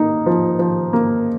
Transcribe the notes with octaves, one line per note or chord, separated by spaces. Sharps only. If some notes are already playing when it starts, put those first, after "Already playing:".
Already playing: A#3 D#4
F3
F3
A#3